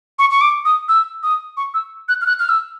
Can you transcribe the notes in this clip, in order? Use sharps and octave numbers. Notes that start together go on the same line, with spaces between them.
C#6
C#6
D6
D#6
E6
D#6
C#6
E6
F#6
F6
F#6
F6
E6